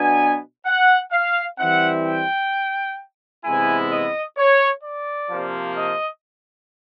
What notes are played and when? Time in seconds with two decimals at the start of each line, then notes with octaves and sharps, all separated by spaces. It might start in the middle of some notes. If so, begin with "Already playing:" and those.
Already playing: B2 F#3 B3 D4 G#5
0.66 F#5
1.12 F5
1.58 E3 G3 C4 E4 F#5
2.06 G5
3.44 C3 E3 G#3 B3 E4 G#5
3.91 D#5
4.37 C#5
4.83 D5
5.30 C3 F3 A#3
5.76 D#5